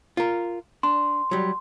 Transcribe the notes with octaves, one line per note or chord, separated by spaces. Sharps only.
F4 A#4
D4 C6
F#3 G3